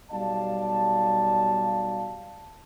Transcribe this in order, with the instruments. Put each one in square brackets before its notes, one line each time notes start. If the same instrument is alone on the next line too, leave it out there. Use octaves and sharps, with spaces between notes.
[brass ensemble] B1 G3 D5 F5 A5